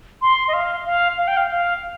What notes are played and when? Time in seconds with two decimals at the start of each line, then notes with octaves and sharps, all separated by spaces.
0.22 C6
0.48 D#5
0.54 F5
0.86 F5
1.18 F5
1.28 G5
1.37 F5
1.51 F5